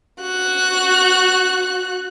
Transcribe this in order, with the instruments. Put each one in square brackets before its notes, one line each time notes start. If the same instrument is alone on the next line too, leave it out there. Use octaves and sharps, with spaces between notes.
[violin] F#4 F#6